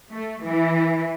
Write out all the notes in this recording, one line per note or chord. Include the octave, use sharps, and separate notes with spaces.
A3
E3